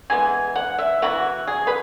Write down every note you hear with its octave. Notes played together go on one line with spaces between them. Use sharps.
E3 G#3 B3 G#5
F#5
E5
E3 B3 E4 F#4
G#4
B4